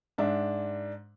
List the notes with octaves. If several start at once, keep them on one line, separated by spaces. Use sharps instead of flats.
G#2 D4 E5